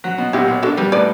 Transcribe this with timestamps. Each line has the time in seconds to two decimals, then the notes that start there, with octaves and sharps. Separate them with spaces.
0.04 F#3
0.18 B2
0.33 B1 E4 G4
0.48 B1
0.63 D4 F#4 A4
0.77 G3 G4 B4
0.92 A2 B4 D5